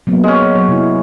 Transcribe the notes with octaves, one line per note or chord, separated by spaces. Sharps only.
F#3 A#3 B3
G#3 C#4
F#3 C#5
C3 E4